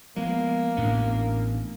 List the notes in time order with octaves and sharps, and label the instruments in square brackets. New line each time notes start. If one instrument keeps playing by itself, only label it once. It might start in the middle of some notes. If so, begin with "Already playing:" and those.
[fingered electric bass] F3 B3 [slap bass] G#3 [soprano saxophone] A#3
[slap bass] A1 A2 B3 [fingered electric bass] D4